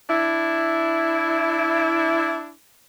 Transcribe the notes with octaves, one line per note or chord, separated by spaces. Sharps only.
D4 E4